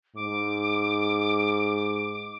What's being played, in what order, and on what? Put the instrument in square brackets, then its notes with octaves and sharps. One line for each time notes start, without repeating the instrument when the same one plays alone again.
[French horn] G#2 [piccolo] D6